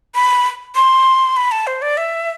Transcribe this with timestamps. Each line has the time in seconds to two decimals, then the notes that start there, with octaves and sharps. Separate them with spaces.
0.15 B5
0.75 C6
1.37 B5
1.52 A5
1.67 C5
1.82 D5
1.97 E5